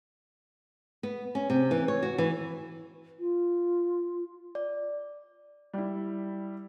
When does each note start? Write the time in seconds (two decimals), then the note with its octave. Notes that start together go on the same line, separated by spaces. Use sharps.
1.03 B3
1.35 C#4
1.50 C3
1.71 E3
1.88 C#5
2.03 F#4
2.18 E3
3.19 F4
4.55 D5
5.73 G3 E4